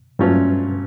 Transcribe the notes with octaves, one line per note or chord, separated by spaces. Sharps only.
G2 A#2 F#3 A3 C#4 F4